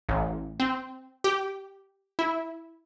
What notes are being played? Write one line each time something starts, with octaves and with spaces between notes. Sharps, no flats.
A1
C4
G4
E4